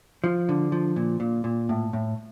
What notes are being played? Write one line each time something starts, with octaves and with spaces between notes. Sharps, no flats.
F3
D3
F3
A#2
A#2
A#2
A2
A2